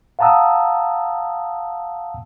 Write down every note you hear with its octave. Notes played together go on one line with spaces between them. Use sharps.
F5 F#5 A5 A#5 D#6 E6